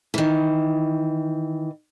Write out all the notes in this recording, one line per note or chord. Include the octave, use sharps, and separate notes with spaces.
D#3 E3